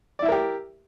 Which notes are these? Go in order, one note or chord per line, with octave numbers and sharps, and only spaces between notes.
E4 G4 A#4 D5 E5